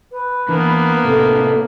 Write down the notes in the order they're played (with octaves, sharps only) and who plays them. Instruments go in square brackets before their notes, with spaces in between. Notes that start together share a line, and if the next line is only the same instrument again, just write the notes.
[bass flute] B4
[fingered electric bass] E3 [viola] A#3 B3 [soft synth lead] D4
[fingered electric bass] A2 C3 [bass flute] A3